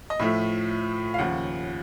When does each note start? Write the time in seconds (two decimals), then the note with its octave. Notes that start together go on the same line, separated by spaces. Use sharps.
0.10 D#5
0.19 A2 F3 A3 E5
1.14 F5
1.18 D#2 C#3 F3 F#5